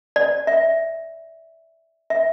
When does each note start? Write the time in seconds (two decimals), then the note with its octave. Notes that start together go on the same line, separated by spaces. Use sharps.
0.16 D5
0.47 E5
2.10 E5